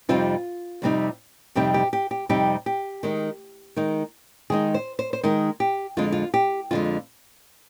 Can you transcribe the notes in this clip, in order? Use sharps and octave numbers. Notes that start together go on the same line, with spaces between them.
F2 C3 G3 C4 D#4 F4
F2 C3 G3 C4 D#4
F2 C3 G3 C4 D#4 G4
G4
G4
G4
F2 C3 G3 C4 D#4 G4
G4
D#3 G#3 D#4
D#3 G#3 D#4
D#3 G#3 D#4 G#4
C5
C5
C5
D#3 G#3 D#4 A#4
G4
F2 D3 G#3 F4
F4
G4
F2 D3 G#3 F4